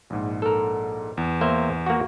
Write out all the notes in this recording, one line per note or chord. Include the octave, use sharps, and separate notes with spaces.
A#1 G#2
A4 A#4
E2
A#3 C5 E5
A#3 F#4